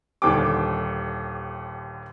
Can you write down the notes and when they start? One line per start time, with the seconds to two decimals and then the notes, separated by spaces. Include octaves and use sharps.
0.22 D#1 D#2 D3 G5 D6